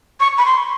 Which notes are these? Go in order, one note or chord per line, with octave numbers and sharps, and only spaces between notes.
C#6
B5
C6